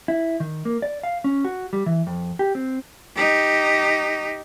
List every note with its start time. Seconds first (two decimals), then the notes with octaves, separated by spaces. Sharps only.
0.08 E4
0.40 D#3
0.65 A#3
0.82 D5
1.03 F5
1.24 C#4
1.45 F#4
1.73 G3
1.86 E3
2.07 F2
2.39 G4
2.55 C4
3.15 D#4 G4